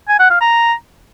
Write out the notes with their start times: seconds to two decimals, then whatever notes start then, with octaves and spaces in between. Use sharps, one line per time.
0.09 G#5
0.19 F#5
0.30 F5
0.41 A#5